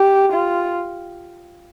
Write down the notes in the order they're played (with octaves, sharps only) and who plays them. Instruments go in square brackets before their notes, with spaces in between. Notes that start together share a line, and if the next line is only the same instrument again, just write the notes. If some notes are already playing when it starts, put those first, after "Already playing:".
Already playing: [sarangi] G4
F4